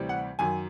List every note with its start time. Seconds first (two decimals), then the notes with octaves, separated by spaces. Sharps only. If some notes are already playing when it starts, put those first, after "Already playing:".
Already playing: D2 C3 E3 G3
0.09 F#5
0.39 F#2 D#3 F#3 G#5